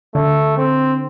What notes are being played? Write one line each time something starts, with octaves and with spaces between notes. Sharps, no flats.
D3 A3
C4